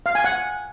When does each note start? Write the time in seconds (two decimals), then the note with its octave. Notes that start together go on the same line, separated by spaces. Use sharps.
0.06 F5
0.15 G#5
0.24 F#5